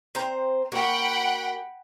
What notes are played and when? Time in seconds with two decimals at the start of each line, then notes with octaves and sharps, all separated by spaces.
0.15 C4 C5 A#5
0.72 A#3 F#4 F#5 G5 B5